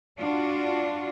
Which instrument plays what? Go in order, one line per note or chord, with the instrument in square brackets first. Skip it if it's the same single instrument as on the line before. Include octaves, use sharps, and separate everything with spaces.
[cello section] D4 F4 F#4